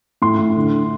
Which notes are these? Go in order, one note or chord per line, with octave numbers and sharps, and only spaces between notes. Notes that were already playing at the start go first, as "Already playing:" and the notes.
A2 C6
A2
D3